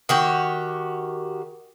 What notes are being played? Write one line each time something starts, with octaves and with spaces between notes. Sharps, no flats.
D#3 F#4 G4